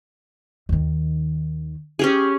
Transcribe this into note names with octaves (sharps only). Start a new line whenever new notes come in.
D#2 D#3
C#4 G4 G#4